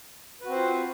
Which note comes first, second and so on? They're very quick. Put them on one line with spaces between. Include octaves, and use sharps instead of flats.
B4 F#4 C4 C5 F4